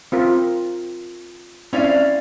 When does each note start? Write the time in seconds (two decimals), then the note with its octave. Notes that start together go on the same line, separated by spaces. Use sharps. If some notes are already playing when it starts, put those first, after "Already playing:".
0.12 C4 F4 A#4
1.73 C4 C#4 E4 D5 F5